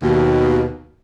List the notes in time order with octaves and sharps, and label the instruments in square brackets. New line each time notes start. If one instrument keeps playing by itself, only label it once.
[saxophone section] D#2 B2